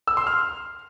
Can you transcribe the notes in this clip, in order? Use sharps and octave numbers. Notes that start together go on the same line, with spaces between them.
E6
C6
F6